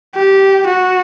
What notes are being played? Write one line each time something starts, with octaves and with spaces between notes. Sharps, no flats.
G4
F#4